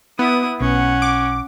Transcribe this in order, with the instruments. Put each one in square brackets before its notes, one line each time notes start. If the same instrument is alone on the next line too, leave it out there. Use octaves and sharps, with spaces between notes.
[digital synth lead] B3 [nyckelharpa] E4 D#6
[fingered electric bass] B1 [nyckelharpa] C#4 F#5
[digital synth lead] D6